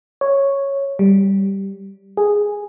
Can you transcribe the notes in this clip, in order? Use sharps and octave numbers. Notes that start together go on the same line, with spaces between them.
C#5
G3
G#4